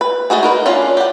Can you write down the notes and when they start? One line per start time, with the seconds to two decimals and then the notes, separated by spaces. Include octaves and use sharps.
0.01 B4
0.30 A3 D#4 F#4 G#4
0.43 D#4 A#4 B4
0.66 C#4 D4 F4
0.97 G4 F#5